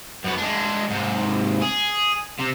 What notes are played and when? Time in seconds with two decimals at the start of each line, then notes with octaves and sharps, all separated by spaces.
0.24 F#2 B3
0.37 G#3 D4
0.90 G#2 C3
1.62 G#4
2.40 C3